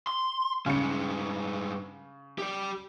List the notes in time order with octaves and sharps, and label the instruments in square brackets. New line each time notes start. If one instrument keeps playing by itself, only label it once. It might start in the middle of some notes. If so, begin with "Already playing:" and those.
[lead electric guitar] C6
[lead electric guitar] G2 G#3 [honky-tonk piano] C#3 C#7
[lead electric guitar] G4 D5